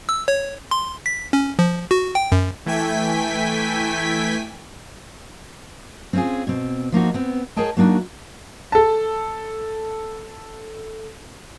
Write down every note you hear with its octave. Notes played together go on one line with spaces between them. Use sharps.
E6
C#5
C6
B6
C#4
F3
F#4
G5
F#2
E3 A3 G5 G#5 B6
C4 C#4 D#4 F4 G#4
B2 C4
F3 A#3 D#4 F#4
B3 C4
G#4 A#4 C#5 D#5 G5 A5
F#3 A#3 D4 D#4 F#4
A4 A5